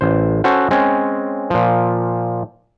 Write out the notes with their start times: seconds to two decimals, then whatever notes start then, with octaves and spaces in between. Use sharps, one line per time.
0.01 A1 C5
0.44 C#4 F#4 A4 C5 F#5
0.71 G#3 C4 C#4
1.50 A#2 F3